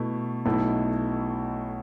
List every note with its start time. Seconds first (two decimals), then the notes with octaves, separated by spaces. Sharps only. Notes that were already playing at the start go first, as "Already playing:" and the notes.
Already playing: B2 A3 E4
0.45 B1 B2 A3 E4 A4